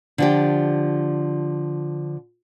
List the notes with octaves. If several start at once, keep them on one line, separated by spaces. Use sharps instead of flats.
D3 F3 G4